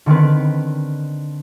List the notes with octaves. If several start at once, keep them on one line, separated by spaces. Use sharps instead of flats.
D3 D#3 C4 B4